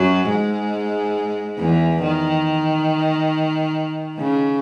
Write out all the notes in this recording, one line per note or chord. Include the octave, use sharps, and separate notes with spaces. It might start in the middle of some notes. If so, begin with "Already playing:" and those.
Already playing: F#2 F#3
G#2 G#3
E2 E3
D#3
C#3